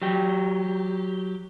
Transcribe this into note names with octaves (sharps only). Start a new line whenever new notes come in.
F#3 G4